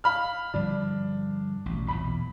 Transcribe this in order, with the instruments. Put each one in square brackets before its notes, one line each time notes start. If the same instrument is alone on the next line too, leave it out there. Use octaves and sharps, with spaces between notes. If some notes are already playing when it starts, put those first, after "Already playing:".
[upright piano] F5 B5 F6
[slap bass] G2 D3 F3 [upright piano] D4
[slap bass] A1 B2
[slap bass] B1 E2 A#2 [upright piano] B5